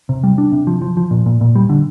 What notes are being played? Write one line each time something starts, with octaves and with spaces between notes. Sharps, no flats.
C3
G3
D4
C3
F3
F3
F3
A#2
A#2
A#2
G3
D3